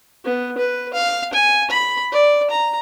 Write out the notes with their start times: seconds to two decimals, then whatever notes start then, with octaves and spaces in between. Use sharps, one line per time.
0.25 B3
0.58 B4
0.94 F5
1.33 G#5
1.70 B5
2.12 D5
2.50 A#5